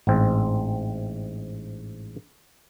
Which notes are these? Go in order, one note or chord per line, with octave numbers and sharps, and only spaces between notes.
A1 G#2 C4